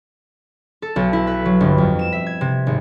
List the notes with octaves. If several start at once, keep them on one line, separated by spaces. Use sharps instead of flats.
A4
B1
E4
B4
F#3
G1
F2
E7
E5
G#6
C3
G#1